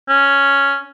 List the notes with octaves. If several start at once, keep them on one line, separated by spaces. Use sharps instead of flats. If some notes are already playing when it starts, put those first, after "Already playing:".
C#4